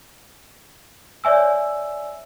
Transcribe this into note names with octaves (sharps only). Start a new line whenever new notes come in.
C#5 D5 E5 G#5 E6